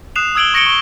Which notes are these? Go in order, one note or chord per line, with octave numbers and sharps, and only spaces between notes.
D#6 F#6 C7 E7 F7
D#6 E6 G#6 D7 F#7 G7
C#6 A#6 C#7 D7 G7
C#6 G7